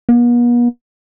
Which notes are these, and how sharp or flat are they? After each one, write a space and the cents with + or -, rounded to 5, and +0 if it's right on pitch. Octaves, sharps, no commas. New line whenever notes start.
B3 -45